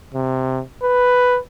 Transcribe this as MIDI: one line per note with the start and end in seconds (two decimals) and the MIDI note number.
0.14 0.61 48
0.82 1.38 71